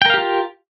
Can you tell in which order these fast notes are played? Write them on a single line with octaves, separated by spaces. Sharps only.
G5 A#4 F5 G4 F4